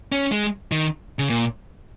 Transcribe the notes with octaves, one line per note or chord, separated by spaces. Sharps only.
C#4
G#3
D#3
C#3
A#2